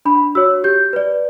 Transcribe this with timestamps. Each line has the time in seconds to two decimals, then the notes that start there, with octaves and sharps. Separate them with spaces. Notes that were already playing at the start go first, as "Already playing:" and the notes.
0.05 D4 B5
0.35 F#4 C#5 E6
0.64 G4 G6
0.93 B4 D5